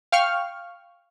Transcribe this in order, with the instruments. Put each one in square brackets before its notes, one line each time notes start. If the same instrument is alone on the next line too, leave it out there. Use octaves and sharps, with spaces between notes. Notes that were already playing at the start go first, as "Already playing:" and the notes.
[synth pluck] F5 G5 C#6 F6